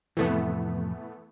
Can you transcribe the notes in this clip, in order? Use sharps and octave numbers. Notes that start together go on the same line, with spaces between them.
F2 A2 C3 E3 A3 B3